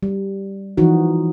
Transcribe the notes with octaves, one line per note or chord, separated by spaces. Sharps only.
G3
E3 F3 D#4 F#4